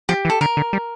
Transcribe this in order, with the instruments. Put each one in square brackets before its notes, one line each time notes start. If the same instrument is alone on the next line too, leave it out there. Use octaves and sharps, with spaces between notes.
[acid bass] F3 [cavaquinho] G4
[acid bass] E3
[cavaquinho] A4
[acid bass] D3 [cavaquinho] A#4
[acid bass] D3
G3